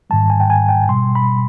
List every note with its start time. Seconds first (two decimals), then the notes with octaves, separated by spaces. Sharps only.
0.10 G#2 D#3 G3 A5
0.30 G#5
0.40 G5
0.50 G#5
0.69 G5
0.89 B2 G3 C6
1.15 B5